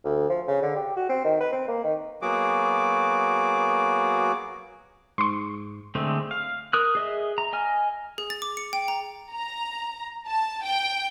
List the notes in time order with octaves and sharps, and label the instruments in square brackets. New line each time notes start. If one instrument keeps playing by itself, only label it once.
[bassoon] D2
F3
C#3
D3
G4
F#4
C4
D#3
B4
C4
A#3
D#3
[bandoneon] F#3 A#3 B3 F#4 G#4 D6
[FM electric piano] G#2 [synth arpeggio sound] C6 C#6
[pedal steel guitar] D3 G#3 A3 C4
F5
A#4 D#6 F#6
G#4 D#5 E5
A#5
D#5 G#5 F6
[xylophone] G#4
A6
D6
C#7
G5
A#5
[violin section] A#5
A5
G5